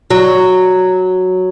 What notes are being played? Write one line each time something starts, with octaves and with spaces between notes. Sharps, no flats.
F#3